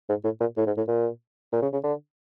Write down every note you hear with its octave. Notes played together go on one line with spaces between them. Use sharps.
G#2
A2
A#2
A2
G#2
A2
A#2
A#2
C#3
C#3
D3